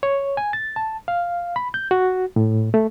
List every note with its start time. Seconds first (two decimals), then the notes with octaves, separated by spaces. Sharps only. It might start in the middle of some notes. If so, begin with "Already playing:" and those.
0.03 C#5
0.37 G#5
0.53 A6
0.76 A5
1.08 F5
1.56 B5
1.74 G6
1.91 F#4
2.36 A2
2.74 A3